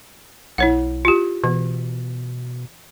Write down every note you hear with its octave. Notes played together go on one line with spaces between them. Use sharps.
B1 E4 C#5 F#5
F4 G4
B2 E3